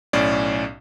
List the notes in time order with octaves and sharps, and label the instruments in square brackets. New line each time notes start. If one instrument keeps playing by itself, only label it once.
[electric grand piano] B1 A2 C#4 D5